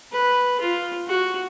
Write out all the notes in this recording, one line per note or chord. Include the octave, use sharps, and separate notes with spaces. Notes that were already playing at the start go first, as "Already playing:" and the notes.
B4
F4
F#4